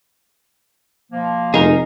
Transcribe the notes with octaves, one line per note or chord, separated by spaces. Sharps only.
B2 F3 A#3
F1 D#4 G#4 A#4